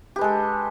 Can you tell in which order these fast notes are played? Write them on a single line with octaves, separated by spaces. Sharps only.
G4 B4 G#3 A4